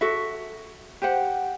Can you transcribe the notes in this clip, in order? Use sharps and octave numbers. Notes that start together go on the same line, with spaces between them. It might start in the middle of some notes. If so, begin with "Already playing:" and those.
F#4 A4 E5
G4 C5 F#5